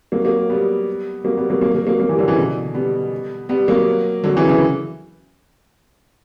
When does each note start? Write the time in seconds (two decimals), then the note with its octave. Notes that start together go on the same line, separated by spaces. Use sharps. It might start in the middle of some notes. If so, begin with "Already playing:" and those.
0.12 F#3 A#3
0.25 F#3 A#3
0.49 G3 B3
1.24 F#3 A#3
1.37 G3 B3
1.50 F#3 A#3
1.61 F#3 A#3
1.74 F#3 A#3
1.87 F#3 A#3
1.99 F#3 A#3
2.09 E3 G3
2.19 D3 F#3
2.28 C#3 E3
2.37 B2 D3
2.74 G3 B3
3.49 G3 B3
3.68 F#3 A#3
4.24 D3 F#3
4.36 C#3 E3
4.49 C#3 E3